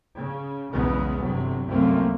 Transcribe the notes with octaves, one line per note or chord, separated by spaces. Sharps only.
C#3
B1 E2 C#3 G#3 B3
G1 E2 C3 F#3
C2 F#2 A3 A#3 C4